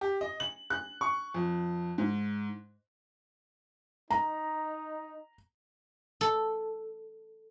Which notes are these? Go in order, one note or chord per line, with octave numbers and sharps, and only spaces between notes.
G4
D#5
F#7
F#6
C#6
F2
G#2
D#4 A#5
A4